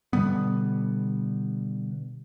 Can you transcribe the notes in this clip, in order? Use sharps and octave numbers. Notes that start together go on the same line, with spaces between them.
B2 D3 G3 B3